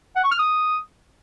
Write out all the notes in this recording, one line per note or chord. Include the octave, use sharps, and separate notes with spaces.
F#5
C#6
F6
D#6